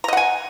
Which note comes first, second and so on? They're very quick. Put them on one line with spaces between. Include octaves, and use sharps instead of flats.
A#5 D#5 F#5 G#5